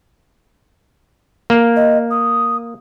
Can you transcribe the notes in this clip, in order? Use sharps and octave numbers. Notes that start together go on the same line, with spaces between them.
A#3
D#5
D#6